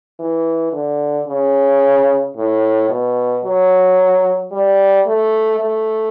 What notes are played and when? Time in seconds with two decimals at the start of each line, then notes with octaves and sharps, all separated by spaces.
0.19 E3
0.73 D3
1.28 C#3
2.36 A2
2.90 B2
3.44 F#3
4.52 G3
5.06 A3
5.60 A3